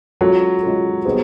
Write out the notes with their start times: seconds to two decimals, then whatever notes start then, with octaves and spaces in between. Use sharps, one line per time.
0.21 F#3 G#3 C#4 F4 A4
0.63 G#3 C#4 F4 A4
1.05 G3 B3 D#4 G#4 C5